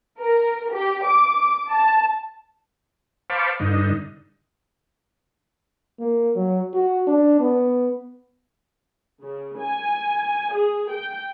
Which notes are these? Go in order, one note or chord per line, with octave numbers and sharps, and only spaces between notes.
A#4
G4
D6
A5
C5 F5 A5 B5 C#6 D6
G2 D3 D#4
A#3
F#3
F#4
D4
B3
C#3
G#5
G#4
G5